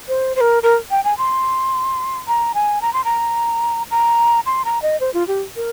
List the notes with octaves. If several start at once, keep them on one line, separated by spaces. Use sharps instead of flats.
C5
C5
A#4
A#4
G5
G#5
C6
A#5
G#5
A#5
C6
A#5
A#5
C6
A#5
D#5
C5
F4
G4
A#4